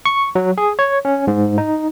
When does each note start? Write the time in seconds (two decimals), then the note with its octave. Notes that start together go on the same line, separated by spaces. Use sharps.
0.05 C#6
0.35 F#3
0.58 G#4
0.79 C#5
1.05 C#4
1.27 G#2
1.58 D#4